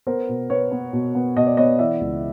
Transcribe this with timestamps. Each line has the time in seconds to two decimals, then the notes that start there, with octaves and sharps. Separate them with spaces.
0.07 B3 A#4 C5
0.29 B2
0.50 B3 B4 C#5
0.72 B3
0.93 B2
1.15 B3
1.36 B2 D#5
1.47 D5
1.57 B3 C#5 D#5
1.79 E3 D5 E5
2.01 C#2